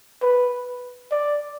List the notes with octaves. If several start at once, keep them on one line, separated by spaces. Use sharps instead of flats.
B4
D5